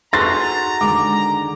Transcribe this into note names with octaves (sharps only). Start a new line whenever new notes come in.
D#4 F#4 G#4 A4 B4 A#5 C6 A6
D3 D#3 G#3 D6